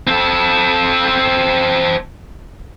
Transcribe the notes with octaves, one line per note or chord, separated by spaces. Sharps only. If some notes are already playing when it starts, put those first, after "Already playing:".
C4 A4